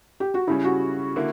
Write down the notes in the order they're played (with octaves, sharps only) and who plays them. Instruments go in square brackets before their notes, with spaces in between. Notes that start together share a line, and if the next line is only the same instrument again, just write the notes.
[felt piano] G4
F#4
[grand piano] C#3 G3 C#4 [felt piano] E4
[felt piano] F#4
[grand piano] D3 A#3 E4